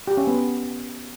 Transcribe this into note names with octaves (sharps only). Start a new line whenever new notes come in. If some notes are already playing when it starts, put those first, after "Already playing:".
G4
C#4
B3